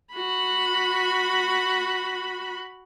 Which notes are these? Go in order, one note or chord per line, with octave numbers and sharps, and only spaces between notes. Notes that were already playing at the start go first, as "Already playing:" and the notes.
F#4 B5